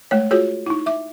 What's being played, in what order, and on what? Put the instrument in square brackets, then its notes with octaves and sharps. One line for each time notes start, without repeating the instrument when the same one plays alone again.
[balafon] G#3 A3 C#5
F4 F#4 G#4 C#5
D#4 E4
E5 D6